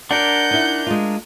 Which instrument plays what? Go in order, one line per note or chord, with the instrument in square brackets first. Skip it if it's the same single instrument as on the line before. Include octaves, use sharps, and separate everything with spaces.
[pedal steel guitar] D4 A#4 [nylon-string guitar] D5 [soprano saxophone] F#5 [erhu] G6
[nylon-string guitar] D#4 E4
G#3 F4